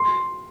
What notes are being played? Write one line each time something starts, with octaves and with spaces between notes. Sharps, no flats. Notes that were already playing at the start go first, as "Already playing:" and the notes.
Already playing: C6